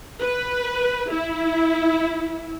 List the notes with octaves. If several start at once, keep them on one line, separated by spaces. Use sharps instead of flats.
B4
E4